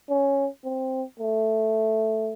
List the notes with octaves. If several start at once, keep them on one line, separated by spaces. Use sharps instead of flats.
C#4
C4
A3